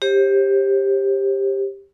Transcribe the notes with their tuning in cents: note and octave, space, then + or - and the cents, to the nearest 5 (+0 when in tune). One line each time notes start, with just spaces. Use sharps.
G4 +10 C5 +40